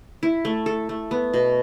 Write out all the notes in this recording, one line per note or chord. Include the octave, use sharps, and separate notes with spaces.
E4
A3
A4
A3
B3
B2